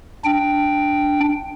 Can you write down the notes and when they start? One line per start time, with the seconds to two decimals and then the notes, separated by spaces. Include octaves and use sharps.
0.25 D4 G5